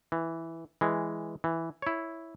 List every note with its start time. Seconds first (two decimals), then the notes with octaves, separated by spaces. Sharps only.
0.12 E3
0.81 E3 G#3
1.44 E3
1.82 E4 C#5